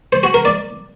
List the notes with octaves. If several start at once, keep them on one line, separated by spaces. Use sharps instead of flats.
C5
F#4
A#4
D5